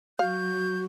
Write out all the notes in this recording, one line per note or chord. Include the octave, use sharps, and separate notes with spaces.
F#3 F#4 F5 G6